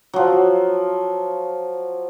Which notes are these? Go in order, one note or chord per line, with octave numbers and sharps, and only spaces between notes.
F3 F#3